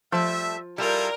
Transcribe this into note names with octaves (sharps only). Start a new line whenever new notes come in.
F3 G3 A3 E5 A5
G3 E4 F4 A4 A#4